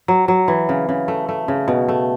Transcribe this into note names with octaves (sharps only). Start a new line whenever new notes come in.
F#3
F#3
E3
C#3
C#3
A3
A3
C#3
B2
A3